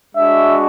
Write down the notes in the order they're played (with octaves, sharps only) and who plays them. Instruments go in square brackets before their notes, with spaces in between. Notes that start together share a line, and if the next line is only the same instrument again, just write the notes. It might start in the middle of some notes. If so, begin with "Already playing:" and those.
[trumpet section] G#3 D4 F#4 E5